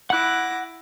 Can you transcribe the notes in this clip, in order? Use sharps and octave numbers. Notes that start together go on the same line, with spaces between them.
E4 F#5 D6 F#6 A#6